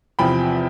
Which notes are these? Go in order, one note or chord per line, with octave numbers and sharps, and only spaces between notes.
E2 C3 F3 G5 B5